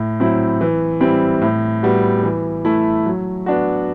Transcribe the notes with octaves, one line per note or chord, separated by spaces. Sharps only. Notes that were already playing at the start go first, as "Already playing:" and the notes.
Already playing: A2
F#3 C4 E4
E3
G3 C4 E4
A2
G3 B3 F#4
E3
A3 E4
F#3
B3 D4 F#4